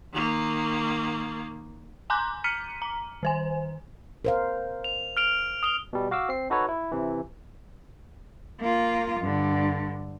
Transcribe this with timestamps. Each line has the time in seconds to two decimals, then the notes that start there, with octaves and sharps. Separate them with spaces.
0.13 D#3 A#3
2.10 G#5 A#5 C6 D6 F#6 G6
2.44 A#5 F6 B6 C#7 D#7
2.82 A#5
3.23 D#3 C5 G#5
4.25 A#4 C5 F5
4.84 F7
5.17 F6 D7 F7
5.63 D#6 F7 G7
5.93 B2 G3
6.11 F#4 F5 D6 E6
6.29 C4 C7
6.50 D#4 F#4 A4 B4 C#5
6.69 E4
6.92 C3 E3
8.61 A#3 F4
9.21 G2 D3